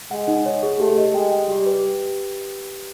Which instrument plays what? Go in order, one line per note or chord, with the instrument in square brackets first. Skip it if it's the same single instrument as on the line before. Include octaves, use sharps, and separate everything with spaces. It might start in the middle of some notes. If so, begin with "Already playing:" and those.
[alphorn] G#3 [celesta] F#5
[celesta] D#4
C#5
G#4
[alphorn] A3 [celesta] G4
[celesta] D#5
[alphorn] G#3 [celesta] G5
[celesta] G5
[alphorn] G3 [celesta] G4
[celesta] B4